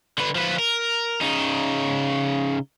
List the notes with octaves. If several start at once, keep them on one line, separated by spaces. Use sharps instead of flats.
D3 B4
F3 B4
A#4
C#3 D#4